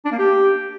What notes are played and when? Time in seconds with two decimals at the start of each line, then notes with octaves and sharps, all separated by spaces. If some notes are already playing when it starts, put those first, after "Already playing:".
0.05 D4
0.12 A#3
0.19 G4